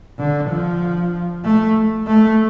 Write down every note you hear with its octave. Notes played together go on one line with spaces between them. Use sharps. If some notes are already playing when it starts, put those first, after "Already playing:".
D3
F3
A3
A3